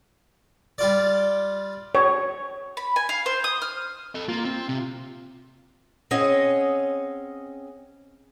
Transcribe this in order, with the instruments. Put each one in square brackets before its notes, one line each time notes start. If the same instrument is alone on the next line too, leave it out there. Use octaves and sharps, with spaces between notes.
[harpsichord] G3 F4 D5
[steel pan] C#5
[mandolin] B5
G#5
F5
C5
D#6
F6
[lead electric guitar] A4 D#5
[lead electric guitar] A#3 [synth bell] F4
[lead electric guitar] C4
C3
[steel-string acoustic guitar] C4 C#4 G#4 C#5 D#5 F#5